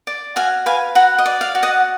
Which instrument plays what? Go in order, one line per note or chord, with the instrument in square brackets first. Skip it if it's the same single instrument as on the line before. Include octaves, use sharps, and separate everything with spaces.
[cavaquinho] D5
F#4 F5 G#5
B4 F5 G#5
F#4 F#5 A#5
D#5
D5
F5
F#4
D#5 F#5